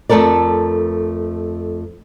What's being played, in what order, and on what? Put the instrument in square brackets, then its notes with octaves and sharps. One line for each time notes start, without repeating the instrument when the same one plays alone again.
[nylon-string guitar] F2 A3 A4 A#4 D5